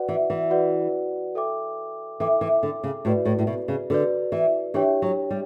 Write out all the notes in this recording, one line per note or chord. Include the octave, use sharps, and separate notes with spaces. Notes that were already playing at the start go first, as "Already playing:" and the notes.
Already playing: F#4 B4 D5 F#5
E3
E3
F#4 B4 D5 F#5
A4 E5 G5 D6
E3 A4 E5 G5 D6
E3
D3
C#3
A2 F#4 B4 D5
A2
A2
B2
C#3
D3 F#4 B4 D5
E3
E3 D4 G4 C#5 G5
F#3
G3